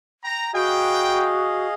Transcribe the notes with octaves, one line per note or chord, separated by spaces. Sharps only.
G5 A#5
F#4 G#4 B4 D#5 F5 G5